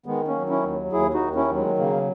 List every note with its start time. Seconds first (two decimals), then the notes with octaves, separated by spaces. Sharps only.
0.06 D#3 G#3 B3
0.28 A#3 C#4
0.35 F#3
0.49 C#4 E4
0.64 D#2
0.92 D#2 E4 G#4
1.14 D#4 F#4
1.21 D#3
1.35 C#4 E4
1.50 F#3
1.57 G#3
1.78 C#3 A#3